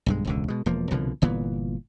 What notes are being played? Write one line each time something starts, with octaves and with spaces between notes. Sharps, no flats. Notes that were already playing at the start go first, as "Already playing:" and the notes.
B1 G2 G#3
E1 C#2 D3
B2 G#3
E1 F3 A#3
C2 B2 D3 F3
G1 A#2 E3 B3